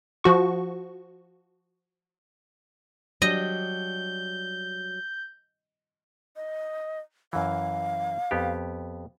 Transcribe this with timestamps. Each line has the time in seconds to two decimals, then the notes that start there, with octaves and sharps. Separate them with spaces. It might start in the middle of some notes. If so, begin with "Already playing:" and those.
0.24 F3 F#4 C#6
3.22 F#3 G3 D4 D#5 G6
6.36 D#5
7.33 F#2 E3 F5
8.31 F2 B3 G4